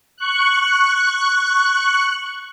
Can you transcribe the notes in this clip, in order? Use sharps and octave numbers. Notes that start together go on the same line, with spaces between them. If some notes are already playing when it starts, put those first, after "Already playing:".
C#6 F#6